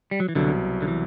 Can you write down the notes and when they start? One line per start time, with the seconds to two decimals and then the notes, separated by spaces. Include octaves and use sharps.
0.11 G3
0.20 F#3
0.29 E3
0.35 C2 B2 D3 F#3
0.82 D3
0.88 E3